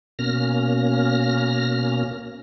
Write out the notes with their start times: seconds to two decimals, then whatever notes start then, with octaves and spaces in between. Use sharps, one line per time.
0.19 B2 A#3 C#4 F6 A#6